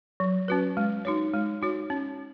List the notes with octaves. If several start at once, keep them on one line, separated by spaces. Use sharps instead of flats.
F#3
C#4 F#4 B4
G#3
D#4 F#4 C#5
G#3
D#4 F#4 C#5
C#4